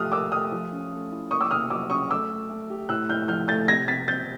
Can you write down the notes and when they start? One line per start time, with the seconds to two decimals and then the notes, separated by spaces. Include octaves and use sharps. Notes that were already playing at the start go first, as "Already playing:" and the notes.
Already playing: F3 A3 G4 D#6 F6 F#6
0.12 A#4 D6 E6
0.32 A3 D#6 F6
0.52 F3
0.72 C#4
0.92 A3
1.11 E4
1.31 A#3 C#6 D#6
1.41 D6 E6
1.50 A#3 D#6 F6
1.70 F#3 D6 E6
1.90 C#3 C#6 D#6
2.10 A3 D6 E6
2.30 A3
2.49 A3
2.70 G4
2.89 A2 E6 F#6
3.09 A2 F6 G6
3.28 F3 F6 G6
3.48 A3 G6 A6
3.68 C3 G#6 A#6
3.88 C3 A6 B6
4.08 C4 G6 A6